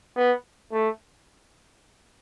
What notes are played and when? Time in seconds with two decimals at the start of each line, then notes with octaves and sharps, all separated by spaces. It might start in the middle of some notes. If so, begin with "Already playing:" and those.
0.16 B3
0.72 A3